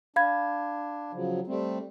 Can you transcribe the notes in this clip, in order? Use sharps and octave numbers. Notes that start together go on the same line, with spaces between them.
D4 F5 B5 G#6
C#3 F3 F#3
G3 A3 C4